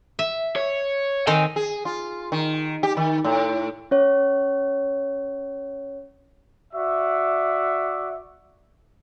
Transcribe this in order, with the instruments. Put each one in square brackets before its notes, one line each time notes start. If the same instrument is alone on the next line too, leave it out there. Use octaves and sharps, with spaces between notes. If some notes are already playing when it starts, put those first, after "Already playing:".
[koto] E5
[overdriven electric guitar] C#5
[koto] D#3 C4 D#4 [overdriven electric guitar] G#5
[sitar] G#4
F4
D#3
G4
D#3
A2
[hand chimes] C#4 C#5
[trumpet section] F#4 D5 E5